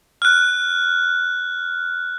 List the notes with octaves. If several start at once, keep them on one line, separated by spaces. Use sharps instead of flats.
F6 F#6